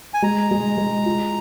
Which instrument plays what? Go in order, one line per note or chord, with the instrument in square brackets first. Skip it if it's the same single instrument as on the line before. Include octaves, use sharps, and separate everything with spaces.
[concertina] G#5
[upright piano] G#3 [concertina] A#5
[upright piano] G#3
G#3
F4